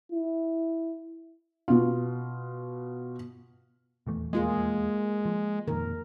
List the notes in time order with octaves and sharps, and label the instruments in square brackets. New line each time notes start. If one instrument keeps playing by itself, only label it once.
[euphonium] E4
[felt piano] B2 F4
[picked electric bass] D#1 E2 A3
[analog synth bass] G#3 [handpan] A#3 F4 G#4
[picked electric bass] F3
[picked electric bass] F2 A#2 D#3 [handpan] A#4